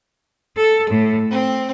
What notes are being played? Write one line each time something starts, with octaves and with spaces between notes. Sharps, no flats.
A4
A2
C4